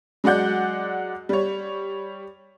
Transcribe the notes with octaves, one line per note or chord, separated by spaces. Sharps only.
F#3 G#3 D5 F#5 G6
G3 C#5